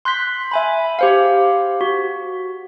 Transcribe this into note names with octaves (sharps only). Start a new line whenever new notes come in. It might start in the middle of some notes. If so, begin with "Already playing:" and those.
C6 F#6 G6 B6
E5 G#5 B5
G4 C5 F5
F#4